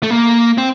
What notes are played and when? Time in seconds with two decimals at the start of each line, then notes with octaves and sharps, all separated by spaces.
0.03 A3
0.10 A#3
0.58 C4